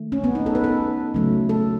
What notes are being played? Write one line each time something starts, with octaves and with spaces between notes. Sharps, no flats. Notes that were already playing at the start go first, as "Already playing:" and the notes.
Already playing: D#3 A3
C#4
B3
D#4
A4
B4
A4
C#3 F#3 A3
A4